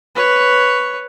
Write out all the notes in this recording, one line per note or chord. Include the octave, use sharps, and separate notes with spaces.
B4 C#5